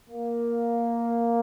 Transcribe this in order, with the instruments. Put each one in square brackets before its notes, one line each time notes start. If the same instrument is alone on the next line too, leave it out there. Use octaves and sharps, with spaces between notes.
[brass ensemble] A#3